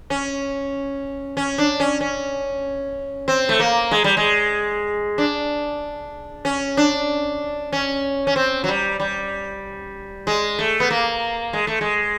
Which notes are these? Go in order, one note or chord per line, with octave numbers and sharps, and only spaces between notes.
C#4
C#4
D4
C#4
C#4
C4
A3
A#3
G#3
G3
G#3
D4
C#4
D4
C#4
C#4
C4
F#3
G3
G3
G#3
A3
B3
A#3
G#3
A3
G#3